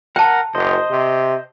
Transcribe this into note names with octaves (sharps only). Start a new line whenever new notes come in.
A#4 F#5 G5 A5
F#1 C5 D#5
C3